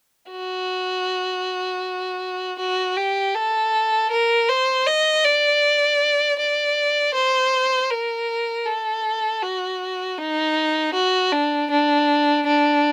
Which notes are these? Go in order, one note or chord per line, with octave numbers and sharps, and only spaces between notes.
F#4
F#4
G4
A4
A#4
C5
D#5
D5
D5
C5
A#4
A4
F#4
D#4
F#4
D4
D4
D4